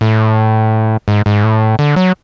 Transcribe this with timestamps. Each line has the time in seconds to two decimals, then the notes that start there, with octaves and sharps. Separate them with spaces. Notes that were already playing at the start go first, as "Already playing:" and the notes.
0.01 A2
1.08 G#2
1.26 G#2
1.44 A2
1.79 D3
1.96 F#3